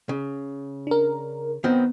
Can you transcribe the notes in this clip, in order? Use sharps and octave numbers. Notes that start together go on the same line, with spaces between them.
C#3
D4 A#4
D#3 F#3 B3 C4